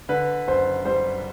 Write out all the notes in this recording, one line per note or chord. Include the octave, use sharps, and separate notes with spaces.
D3 B4
F#1 C5
G3 C5